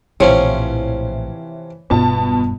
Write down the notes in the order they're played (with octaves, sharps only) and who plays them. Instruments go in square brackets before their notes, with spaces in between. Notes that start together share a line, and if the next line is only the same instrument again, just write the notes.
[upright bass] A#1 A2 [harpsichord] C3 F3 C#4 [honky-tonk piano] E3 [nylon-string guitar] C#5
[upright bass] E1 G2 [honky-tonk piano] B2 F4 A5